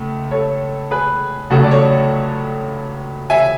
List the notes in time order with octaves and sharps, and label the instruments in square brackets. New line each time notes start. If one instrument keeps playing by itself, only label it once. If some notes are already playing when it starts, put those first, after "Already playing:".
Already playing: [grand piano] C#2 A3
A4 C#5
G#4 B4
C#2 C#3 F#3 A3 F#4 A4
D5
A4 C#5
E5 G#5